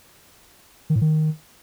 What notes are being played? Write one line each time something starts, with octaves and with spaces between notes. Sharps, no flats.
D#3
A2
D#3